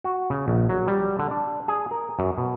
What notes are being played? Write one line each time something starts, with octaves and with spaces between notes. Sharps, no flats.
F#4
C#3
A#1
F#3
G3
D3
D4
G#4
A#4
F#2
B2